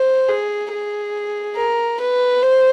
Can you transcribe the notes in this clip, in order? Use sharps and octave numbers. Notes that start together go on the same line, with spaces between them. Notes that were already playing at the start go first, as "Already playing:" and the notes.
Already playing: C5
G#4
G#4
A#4
B4
C5